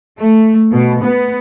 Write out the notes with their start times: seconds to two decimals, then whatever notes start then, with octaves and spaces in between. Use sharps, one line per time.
0.18 A3
0.71 B2
1.03 B3